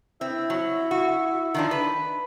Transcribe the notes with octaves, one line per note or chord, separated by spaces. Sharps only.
C4 E4
F#3
F#4
D#3 F3 D4
B4